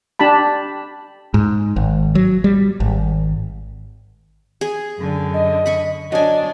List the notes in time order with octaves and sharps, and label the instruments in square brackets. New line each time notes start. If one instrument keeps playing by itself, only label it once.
[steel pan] D4 G4 A5 B5
[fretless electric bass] G#2
G#1
F#3
G3
G#1
[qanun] G#4
[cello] F#2 D3
[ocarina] D#5
[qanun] B5 C#6
[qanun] F#3 G#5 [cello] D4 [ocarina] D#5